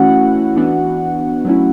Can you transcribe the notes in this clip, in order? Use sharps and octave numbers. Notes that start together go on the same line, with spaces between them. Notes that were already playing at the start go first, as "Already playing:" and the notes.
Already playing: E3 A3 C#4 E4 F#4 F#5
E3 B3 D4
F#3 A3 C#4 E4